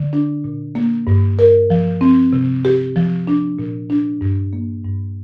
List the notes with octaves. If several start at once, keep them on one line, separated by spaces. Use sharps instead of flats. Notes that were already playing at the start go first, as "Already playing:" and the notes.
Already playing: D3
D4
A#2
A#3
G2
A#4
F3
C4
C3
G4
F3
D4
A#2
D4
G2
A#3
G2